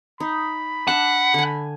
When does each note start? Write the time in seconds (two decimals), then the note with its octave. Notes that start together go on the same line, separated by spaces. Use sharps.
0.20 D#4 B5
0.88 D4 E5 F#5 A5
1.34 D3 G#5